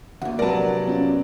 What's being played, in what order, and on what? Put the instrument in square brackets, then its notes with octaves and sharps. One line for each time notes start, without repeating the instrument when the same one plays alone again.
[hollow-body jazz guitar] D2 A#2 [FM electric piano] F#5
[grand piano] A#1 C3 F#3 [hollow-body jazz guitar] A#4 B4 [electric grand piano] D5 A5
[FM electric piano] B3 C#4 F4